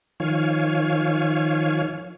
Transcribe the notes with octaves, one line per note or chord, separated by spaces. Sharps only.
D#3 F3 C#5 F5 G#5